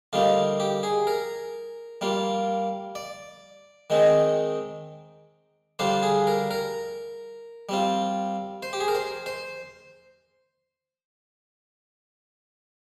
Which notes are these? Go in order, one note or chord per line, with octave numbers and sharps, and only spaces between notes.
D3 G3 A#3 D#4 F4
G4
G#4
A#4
G3 A#3 F4
D5
D#3 G#3 C4 D#4
D3 G3 D4 F4 C5
G#4
A#4
A#4
G3 C4 F4
C5
G4
G#4
A#4
C5
C5